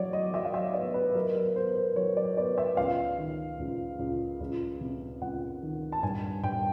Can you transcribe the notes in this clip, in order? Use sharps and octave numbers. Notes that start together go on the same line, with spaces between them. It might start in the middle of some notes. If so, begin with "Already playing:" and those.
Already playing: F#3 E4 C#5 D5
D#5
F#3 E5
F5
E5
B3 D5
B4
F#3 A#4
A#4
B3 C5
C5
F#3 C#5
D5
B3 D5
E5
C#2 F5
D#3
C#2
C#2
C#2
C3
C#2 F#5
D#3
A5
G2 G#5
G2 G5